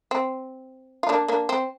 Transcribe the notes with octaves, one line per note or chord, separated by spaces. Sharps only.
C4
F4
A#3 D4
A#3 D4
C4